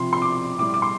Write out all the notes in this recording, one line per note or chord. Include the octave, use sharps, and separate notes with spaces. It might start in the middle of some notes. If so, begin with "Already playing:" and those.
Already playing: C3 F3 C6
C6
D6
A2 G3 D6
D6
C6